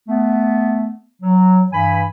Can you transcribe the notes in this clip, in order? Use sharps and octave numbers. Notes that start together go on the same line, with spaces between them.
A3 B3
F#3
G2 E3 G#5 B5